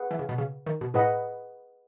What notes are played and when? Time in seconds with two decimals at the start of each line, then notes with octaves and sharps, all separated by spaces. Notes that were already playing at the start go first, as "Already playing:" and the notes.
Already playing: G#4 B4 F#5
0.11 E3
0.19 C#3
0.29 B2
0.38 C#3
0.66 D#3
0.81 B2
0.94 A2 G#4 B4 D#5 F#5 B5